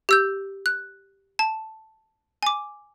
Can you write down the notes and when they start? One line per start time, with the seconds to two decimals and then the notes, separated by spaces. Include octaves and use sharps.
0.09 G4 E6 G6
0.66 F#6
1.39 A5
2.43 G#5 D6